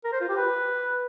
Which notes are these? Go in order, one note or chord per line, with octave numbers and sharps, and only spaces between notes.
A#4
C5
F4
G4
B4